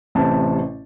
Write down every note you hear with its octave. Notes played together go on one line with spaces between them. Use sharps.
A1 C3 A5